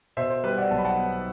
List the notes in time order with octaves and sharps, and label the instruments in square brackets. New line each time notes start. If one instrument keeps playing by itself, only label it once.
[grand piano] B2 C5 E5
C5
G3 B4
D5 F#5
B1 A5
B5
F#5 A5
B3